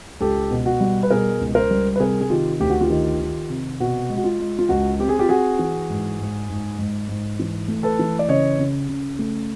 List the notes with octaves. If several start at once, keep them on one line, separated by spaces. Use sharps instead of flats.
C#2 G4 A4
B2
F#4
G3
B4
B2 G#4 A#4
C#2
A#4 C5
G3
B4
C3 G#4 A#4
G#4
D#3 F4 G4
D2 G4
F#4
F4 G4
D#3
D#3
C3
B2 F#4
G#3
F#4
F4
G#3
F4
C#2 F#4
C4 G4
G#4
F4 G4
C4 F#4 G#4
E3
G#2
G#2
G#2
G#2
G#2
E3
A3
A4 B4
E3
D5
C#3 C#5 D#5
C#3
C#3
A3